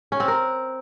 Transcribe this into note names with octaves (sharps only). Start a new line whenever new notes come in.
C#4
C4
A#4